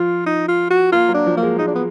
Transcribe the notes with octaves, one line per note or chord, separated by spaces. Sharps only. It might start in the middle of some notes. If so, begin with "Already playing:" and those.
Already playing: F3 F4
D#4
F4
F#4
A#3 F4
F#3
D4
F3
A#3
G#3
G#3 D#4
D4
B3